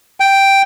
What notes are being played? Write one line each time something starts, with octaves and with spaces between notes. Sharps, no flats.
G5